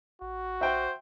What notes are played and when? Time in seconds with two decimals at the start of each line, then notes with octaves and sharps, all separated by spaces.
0.22 A1 F#4
0.61 A#1 C5 E5 G5